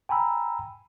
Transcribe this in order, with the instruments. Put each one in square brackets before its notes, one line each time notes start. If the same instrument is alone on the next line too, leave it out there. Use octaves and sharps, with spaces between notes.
[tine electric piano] G5 G#5 A#5 B5 E6